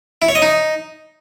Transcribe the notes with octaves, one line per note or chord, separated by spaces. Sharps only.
E4
C#5
D#5
D#4